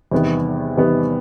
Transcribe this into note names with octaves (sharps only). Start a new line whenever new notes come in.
E2 C3 D#3 G3 B3
E2 C3 D#3 G3 B3